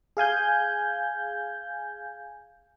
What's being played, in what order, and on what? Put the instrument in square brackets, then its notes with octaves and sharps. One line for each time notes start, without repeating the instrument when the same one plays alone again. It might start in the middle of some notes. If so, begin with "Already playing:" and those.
[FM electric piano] G#4 F5 G#5 G6